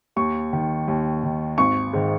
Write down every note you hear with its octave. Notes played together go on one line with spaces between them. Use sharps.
D#2 C#6
D#3
D#2
D#3
G#1 C#6
G#2 D#3